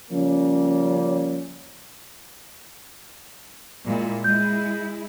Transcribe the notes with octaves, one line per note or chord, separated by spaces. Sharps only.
C#3 F3 G3 A#3 C#4
A#2 G#3 E4
G#3 E4 G#4 G6